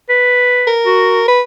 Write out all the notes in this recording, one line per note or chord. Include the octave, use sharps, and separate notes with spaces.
B4
A#4
F#4
B4